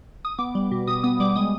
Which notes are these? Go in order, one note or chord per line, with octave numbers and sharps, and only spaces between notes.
D#6
B3 D6
G3
B2
B2 D#6
B3 D#6
G3 D6
G#3 D#6